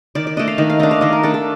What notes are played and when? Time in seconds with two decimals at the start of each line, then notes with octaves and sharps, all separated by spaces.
0.15 D#3 D5
0.27 D5
0.37 A3 D4 D#5
0.48 F5
0.58 D#3 D#5
0.70 F5
0.80 A3 D4 D#5
0.91 F5
1.01 D#3 D#5
1.13 A#4
1.23 A3 D4 A4
1.34 A4